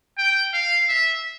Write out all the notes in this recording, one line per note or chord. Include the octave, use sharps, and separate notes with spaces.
G5
F5
E5